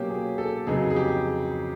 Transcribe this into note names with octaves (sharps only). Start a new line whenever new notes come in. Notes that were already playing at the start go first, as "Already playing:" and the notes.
Already playing: B2 F#3 A#3 C#4 G4
G#4
A4
F2 C#3 F#3 B3 D#4 G#4
G#4
G4